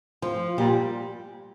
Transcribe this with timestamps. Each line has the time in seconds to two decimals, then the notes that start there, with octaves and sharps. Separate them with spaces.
0.22 F3
0.58 A#2 G3